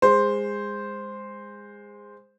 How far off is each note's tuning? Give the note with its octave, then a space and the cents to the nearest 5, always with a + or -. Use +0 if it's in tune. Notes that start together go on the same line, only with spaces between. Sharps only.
G#3 -20 C5 +0